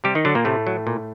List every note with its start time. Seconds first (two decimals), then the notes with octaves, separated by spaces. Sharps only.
0.04 C3 G3 G4
0.15 D#3 D#4
0.25 D3 F#3 D4
0.35 A#2 A#3
0.45 A2 C3 A3
0.67 F#3
0.87 A#2